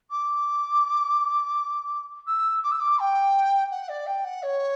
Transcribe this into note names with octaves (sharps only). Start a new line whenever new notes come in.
D6
E6
D6
E6
D6
G5
F#5
D5
G5
F#5
C#5